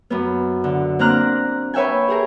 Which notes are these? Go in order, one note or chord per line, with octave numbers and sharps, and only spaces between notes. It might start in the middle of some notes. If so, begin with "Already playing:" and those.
F#2 B3
D3
A#3 C4 D4 A#5 F6 F#6
B4 C#5 E5 G5 G#5
G4 G#4 A#4